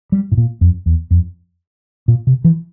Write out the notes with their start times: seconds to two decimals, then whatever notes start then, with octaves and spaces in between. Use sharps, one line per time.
0.12 G3
0.32 A2
0.37 A#2
0.61 F2
0.86 E2
1.11 F2
2.08 A#2
2.27 C3
2.44 E3